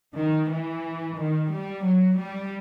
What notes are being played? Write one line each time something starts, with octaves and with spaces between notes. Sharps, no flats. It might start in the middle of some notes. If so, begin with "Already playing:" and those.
D#3
E3
D#3
G3
F#3
G3